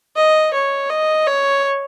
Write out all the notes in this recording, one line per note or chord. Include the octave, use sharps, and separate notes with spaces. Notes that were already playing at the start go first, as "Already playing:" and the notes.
D#5
C#5
D#5
C#5